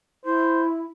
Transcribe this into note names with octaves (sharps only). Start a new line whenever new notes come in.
E4 C5